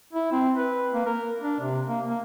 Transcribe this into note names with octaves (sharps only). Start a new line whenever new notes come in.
E4
C4
B4
A#3
A#4
D4
C3
A#3
A#3